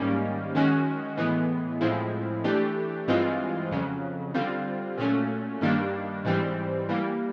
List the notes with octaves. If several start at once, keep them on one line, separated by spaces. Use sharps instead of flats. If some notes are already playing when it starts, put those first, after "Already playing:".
Already playing: G#2 D#3 G3 A#3 C#4
F#2 D#3 G#3 C#4 F#4
A2 E3 G#3 B3
A2 F3 G#3 C4 E4
E3 A3 D4 G4
G2 E3 G#3 C4 F4
F2 C#3 F#3
D3 G3 C4 F4
A#2 F#3 A3 C#4
G2 D#3 G3 A#3 D4
G#2 E3 G3 C4
E3 G3 A#3